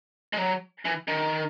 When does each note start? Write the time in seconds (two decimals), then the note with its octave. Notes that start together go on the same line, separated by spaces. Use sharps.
0.33 G#3
0.38 F#3
0.85 E3
1.08 D#3